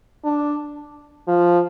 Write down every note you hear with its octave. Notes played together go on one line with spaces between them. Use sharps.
D4
F3